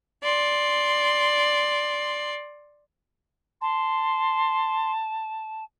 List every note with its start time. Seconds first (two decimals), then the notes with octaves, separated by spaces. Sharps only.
0.23 D5 C6
3.61 A5 C6